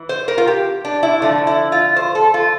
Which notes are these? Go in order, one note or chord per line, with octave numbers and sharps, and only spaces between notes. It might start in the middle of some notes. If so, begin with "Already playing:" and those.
Already playing: E3
C5
A#4
F4
G4
D4
E4
D3 F3 A3 D4
E4
F4
C5
A4
F4